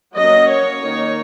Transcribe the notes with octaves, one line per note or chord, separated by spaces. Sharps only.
F#3 A#3 C#4 D#5
C#5
D#3 A#3 D#4